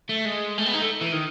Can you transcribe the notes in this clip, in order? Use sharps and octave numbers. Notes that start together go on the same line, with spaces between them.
A3
G#3
A3
B3
D#4
A3
E3
D#3